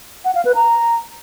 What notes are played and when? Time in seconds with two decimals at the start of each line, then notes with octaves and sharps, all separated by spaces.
0.25 F#5
0.35 F5
0.45 B4
0.55 A#5